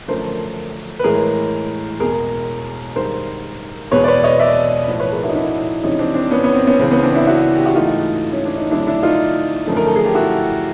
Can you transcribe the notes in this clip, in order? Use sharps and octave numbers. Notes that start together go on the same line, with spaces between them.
F#2 D3 F3 A3 A#4 C5
B4
A2 E3 G#3 G#4 A#4
E2 B2 G#3 G#4 A#4
G2 D#3 G#3 A#4 C5
E2 B2 G#3 B4 C#5
D5
B4 C#5
C#5 D#5
D5 E5
A2 F3 A3
B4 C#5
G#4 A#4
E4 F#4
D#4
D4 E4
F2 C3 E3 G#3 C#4 D#4
C4 D4
C4 D4
B3 C#4
B3 C#4
C4
B3 C#4
C#2 C#3 E3 C4
B3 C#4
C4 D4
D4 E4
E4 F#4
G4
F#4
G#2 E3 A3 D#4 F4
C#4
D4
D#4
F2 D3 F#3 A3 D4 E4
D4 E4
D#4 F4
F#2 D3 F3 A3
A#4
A4
G#4
G4
E4 F#4